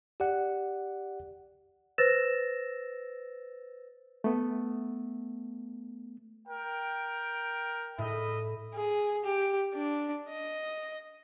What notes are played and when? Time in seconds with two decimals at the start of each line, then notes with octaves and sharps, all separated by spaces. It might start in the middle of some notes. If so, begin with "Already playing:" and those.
0.20 G4 D5 F#5
1.98 B4 C5 E6 A6 A#6 E7
4.24 A3 B3
6.48 A#4 G5
7.98 A2 D#5 E5 B5
8.74 G#4
9.24 G4
9.75 D4
10.29 D#5